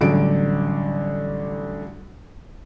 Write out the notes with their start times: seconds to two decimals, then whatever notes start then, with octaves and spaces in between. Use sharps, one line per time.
0.01 A1 D3 F#3 G3 D7